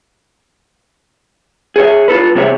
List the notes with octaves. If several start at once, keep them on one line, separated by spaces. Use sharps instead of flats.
G#4 C#5 E5
F4 F#4 A4 B4
C3 E3 C4 G#4 C#5 E5